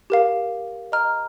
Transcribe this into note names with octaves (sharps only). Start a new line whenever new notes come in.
G4 A#4 F5
D#5 A#5 F6